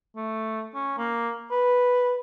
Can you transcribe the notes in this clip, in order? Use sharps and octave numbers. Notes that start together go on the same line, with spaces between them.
A3
C#4
A#3
B4